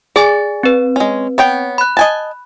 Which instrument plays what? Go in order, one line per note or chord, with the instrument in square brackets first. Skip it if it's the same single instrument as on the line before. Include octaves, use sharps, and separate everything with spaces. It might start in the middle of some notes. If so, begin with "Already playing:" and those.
[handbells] G#4 G#5 A6 [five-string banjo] D5
[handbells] C4 B4
[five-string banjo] G#3 C#4
B3 C#5 G5
[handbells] B5 F#6
[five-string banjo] D#5 G#5 A5